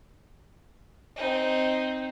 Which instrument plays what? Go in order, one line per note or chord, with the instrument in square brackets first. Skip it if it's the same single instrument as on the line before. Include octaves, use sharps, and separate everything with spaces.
[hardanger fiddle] C4 D#4